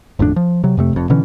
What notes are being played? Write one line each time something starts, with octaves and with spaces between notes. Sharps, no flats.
G#1 F2 A2 D4
F3
C3 F#3
F2 C3 A3
F1 F2
B2 D3 E3 C#4